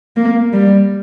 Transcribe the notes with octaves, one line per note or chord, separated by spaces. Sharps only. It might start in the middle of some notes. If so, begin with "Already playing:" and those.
A#3
G3